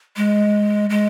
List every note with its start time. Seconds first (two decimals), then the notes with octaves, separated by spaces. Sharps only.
0.16 G#3
0.90 G#3